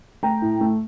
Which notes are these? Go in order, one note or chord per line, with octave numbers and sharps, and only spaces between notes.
A3 G5 A#5
A2
A3